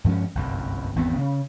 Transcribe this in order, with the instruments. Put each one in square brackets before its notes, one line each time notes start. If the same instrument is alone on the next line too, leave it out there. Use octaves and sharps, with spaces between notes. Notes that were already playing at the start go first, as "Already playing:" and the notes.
[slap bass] G2 F3 G#3 C#4
G1 C2 F#2
G#1 E2 B3 C4
C#3 C#4